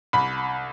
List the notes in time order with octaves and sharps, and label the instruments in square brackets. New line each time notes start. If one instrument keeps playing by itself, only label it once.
[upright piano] C2 B5